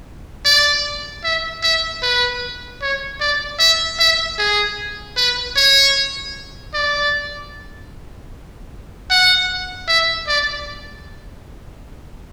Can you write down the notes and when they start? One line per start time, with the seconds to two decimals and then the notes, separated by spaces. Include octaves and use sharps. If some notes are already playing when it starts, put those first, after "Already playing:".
0.45 D5
1.24 E5
1.63 E5
2.03 B4
2.82 C#5
3.20 D5
3.59 E5
3.99 E5
4.38 G#4
5.17 B4
5.56 C#5
6.74 D5
9.10 F#5
9.88 E5
10.27 D5